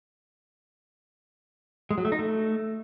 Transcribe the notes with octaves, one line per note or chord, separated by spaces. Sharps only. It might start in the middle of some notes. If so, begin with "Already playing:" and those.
G#3
F#3
A3
D#4
A3